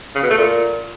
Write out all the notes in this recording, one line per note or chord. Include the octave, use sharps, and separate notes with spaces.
C#3
B2
A3
A#2